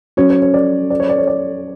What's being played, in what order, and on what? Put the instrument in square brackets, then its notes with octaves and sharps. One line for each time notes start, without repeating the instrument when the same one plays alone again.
[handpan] F#3 C#4 F#4 [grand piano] C#5
[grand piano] C#5
C#5
D5
D5
C#5
D5
C#5
D5